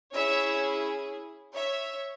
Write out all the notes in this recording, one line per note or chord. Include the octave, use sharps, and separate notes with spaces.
C#4 E4 G#4 C#5 E5
C#5 E5